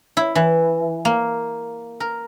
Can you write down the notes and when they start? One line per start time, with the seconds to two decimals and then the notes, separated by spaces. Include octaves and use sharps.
0.17 E4
0.35 E3
1.05 A#3
2.00 A#4